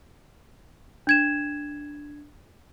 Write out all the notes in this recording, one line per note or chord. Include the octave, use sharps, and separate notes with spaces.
D4 G#6 E7